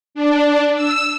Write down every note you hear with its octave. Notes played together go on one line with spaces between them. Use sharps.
D4
E6